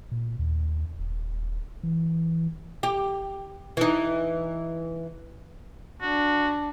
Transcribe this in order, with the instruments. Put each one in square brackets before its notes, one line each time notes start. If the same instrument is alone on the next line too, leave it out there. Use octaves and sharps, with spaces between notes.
[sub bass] A#2
D#2
D#1
E3
[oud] G4
E3 D#4
[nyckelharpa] D4 [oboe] F#4